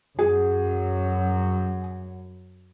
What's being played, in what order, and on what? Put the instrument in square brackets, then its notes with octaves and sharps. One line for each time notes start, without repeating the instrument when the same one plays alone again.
[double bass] F#2 F#3 [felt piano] G#4